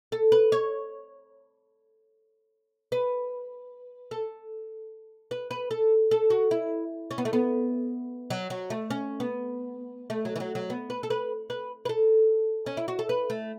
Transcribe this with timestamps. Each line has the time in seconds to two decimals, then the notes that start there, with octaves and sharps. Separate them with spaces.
0.12 A4
0.32 B4
0.52 C#5
2.92 B4
4.11 A4
5.31 B4
5.51 B4
5.71 A4
6.11 A4
6.30 F#4
6.51 E4
7.11 C#4
7.18 B3
7.25 A3
7.33 B3
8.30 F#3
8.50 F#3
8.70 A3
8.90 C#4
9.20 B3
10.10 A3
10.25 F#3
10.36 E3
10.40 F#3
10.55 F#3
10.70 B3
10.90 B4
11.03 A4
11.10 B4
11.50 B4
11.85 B4
11.89 A4
12.66 C#4
12.77 E4
12.88 F#4
12.99 A4
13.09 B4
13.30 A3